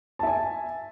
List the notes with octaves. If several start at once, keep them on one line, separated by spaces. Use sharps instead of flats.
E5 G#5 A5